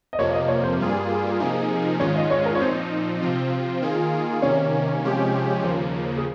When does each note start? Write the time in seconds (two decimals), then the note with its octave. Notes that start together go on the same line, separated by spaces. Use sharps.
0.13 D#5
0.18 F2 C3 F3 A#3 C#5
0.34 D#5
0.48 C#5
0.63 C5
0.79 G2 G3 A#3 F4 G#4
1.40 C3 F3 A#3 D#4 G#4
2.00 G#2 D#3 G#3 C#4 F4 C#5
2.16 D#5
2.31 C#5
2.46 A#4
2.55 C#5
2.60 A#2 F3 C4 D#4 C5
3.21 C3 F3 C4 F4
3.82 D#3 A#3 F4 G#4
4.42 C3 D#3 A#3 C#4 C#5
5.03 C3 F3 G#3 C#4 G4
5.63 D#2 C#3 F3 A#3 C5
6.17 G#4